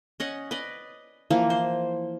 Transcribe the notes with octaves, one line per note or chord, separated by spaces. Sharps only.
C#4 D#5 F#5
B4 D5 D#5
E3 F3 A#3
C5